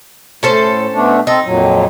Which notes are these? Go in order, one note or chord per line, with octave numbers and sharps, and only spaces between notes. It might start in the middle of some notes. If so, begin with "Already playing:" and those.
A2 C#4 A4 C5
B2 A3 D4
C4 D#4 A4
F2 A#2 F#3